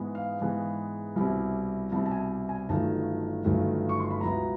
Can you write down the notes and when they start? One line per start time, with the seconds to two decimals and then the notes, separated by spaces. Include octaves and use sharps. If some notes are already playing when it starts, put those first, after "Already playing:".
Already playing: G#2 E3 G#3 B3
0.15 F5
0.40 G#2 E3 G#3 B3
1.16 C2 B2 G3 C4 E4
1.92 C2 B2 G3 C4 E4 A5
2.06 A5
2.11 G#5
2.49 G#5
2.69 G1 G2 D#3 F#3 A3 A5
3.44 G1 G2 D#3 F#3 A3
3.89 C#6
4.00 C6
4.10 B5
4.20 C#2 B2 F#3 B3 E4 A#5